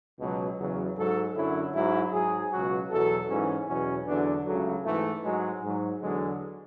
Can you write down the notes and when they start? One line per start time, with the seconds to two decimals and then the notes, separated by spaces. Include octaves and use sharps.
0.19 C#2 B2 F#3
0.58 E2 C#3 F#3
0.96 G#2 F#3 A4
1.35 F#2 D3 F#3 E4
1.73 G#2 F#3 E4
2.12 G#2 F#3 G#4
2.52 C#2 B2 F#3 F#4
2.90 E2 B2 F#3 A4
3.29 G#2 E3 C#4
3.68 E2 B2 F#3 C#4
4.07 E2 D3 F#3 D4
4.46 C#2 C#3 F#3 A3
4.85 G#2 E3 A3
5.23 G#2 F#3 G#3
5.62 G#2 F#3
6.01 E2 D3 F#3 G#3